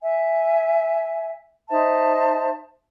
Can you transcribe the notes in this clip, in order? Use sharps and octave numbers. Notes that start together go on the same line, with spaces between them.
E5 G#5
D#4 C5 E5 A5